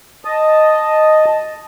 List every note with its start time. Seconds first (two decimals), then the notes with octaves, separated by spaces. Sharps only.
0.25 D#5 A5